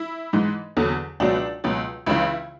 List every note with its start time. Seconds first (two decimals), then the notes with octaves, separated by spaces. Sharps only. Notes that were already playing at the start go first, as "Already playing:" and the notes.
Already playing: E4
0.33 G#2 E3
0.77 E2 D3 F#3
1.20 C#2 B2 F#3 D4
1.64 C#2 B2 F#3
2.06 C#2 C#3 E3 E4